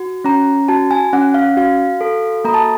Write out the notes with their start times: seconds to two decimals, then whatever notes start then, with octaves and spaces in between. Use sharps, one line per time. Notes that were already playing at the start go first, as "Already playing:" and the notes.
Already playing: F#4
0.24 C#4 A#5
0.68 F#4 A5
0.91 G#5
1.13 C#4 F#5
1.34 F5
1.57 F#4 F5
2.01 A4
2.45 A#3 A#5
2.54 A5